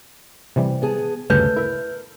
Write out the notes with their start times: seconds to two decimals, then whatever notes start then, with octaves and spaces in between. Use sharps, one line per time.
0.56 C3 E3 G3
0.82 B3 G#4 A5
1.30 D2 G2 C#3 A3 B4 G6
1.56 E4 A#4 E5